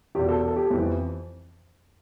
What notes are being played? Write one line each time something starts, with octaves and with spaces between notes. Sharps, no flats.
E2 B2 G4
A4
A4
G4
F2 E3